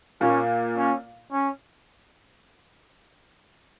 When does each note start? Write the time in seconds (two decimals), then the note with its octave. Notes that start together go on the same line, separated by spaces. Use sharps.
0.21 A#2 A#3 C#4
0.76 C#4
1.32 C#4